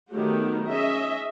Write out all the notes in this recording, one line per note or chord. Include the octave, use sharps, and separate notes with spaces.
D#3 F#3 A3 B3 F#4 G4
C#4 G#4 D#5 E5